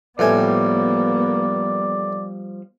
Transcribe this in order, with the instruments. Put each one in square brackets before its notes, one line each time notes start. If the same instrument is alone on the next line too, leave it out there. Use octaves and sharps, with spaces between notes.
[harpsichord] A1 A2 G#5 [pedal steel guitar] F3 G3 [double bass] A#3 B3 [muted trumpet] D5